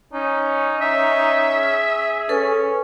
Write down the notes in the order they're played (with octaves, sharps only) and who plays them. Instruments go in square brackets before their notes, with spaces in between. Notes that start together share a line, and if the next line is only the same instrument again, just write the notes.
[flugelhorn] C#4 [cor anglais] D#4
[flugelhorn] C#4 [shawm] E5
[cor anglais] G#4
[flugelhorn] C#4 [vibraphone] A4 B4